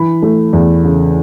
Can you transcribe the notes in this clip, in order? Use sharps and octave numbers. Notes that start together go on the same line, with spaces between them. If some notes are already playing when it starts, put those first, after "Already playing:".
Already playing: E3 B5
A3
E2
C#3